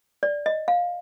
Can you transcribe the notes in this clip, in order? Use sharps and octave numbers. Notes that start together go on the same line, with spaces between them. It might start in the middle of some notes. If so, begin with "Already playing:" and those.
D5
D#5
F5